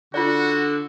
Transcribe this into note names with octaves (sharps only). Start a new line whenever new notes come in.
D3 F4 F#4 D5